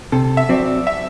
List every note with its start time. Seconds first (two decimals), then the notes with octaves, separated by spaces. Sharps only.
0.12 C3 A4
0.37 E5
0.49 F#3 C4 D5
0.87 E5